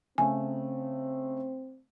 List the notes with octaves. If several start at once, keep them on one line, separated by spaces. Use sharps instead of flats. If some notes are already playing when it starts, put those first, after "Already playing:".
C#3 A3 C4 G#5